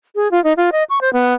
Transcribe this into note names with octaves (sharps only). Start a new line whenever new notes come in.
G#4
F4
D#4
F4
D#5
C#6
C5
B3